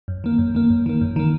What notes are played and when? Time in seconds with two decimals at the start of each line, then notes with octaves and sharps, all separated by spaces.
0.08 F#2
0.24 D#3 A#3
0.38 F#2
0.55 D#3 A#3
0.70 F#2
0.86 D#3 A#3
1.01 F#2
1.16 D#3 A#3